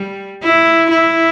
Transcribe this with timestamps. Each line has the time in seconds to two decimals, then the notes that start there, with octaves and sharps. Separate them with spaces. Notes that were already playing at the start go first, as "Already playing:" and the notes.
Already playing: G3
0.43 E4
0.90 E4